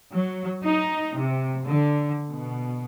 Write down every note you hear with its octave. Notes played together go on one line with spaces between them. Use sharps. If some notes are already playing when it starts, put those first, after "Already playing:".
F#3
D#4
C3
D3
B2